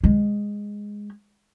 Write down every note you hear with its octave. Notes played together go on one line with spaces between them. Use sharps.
G#3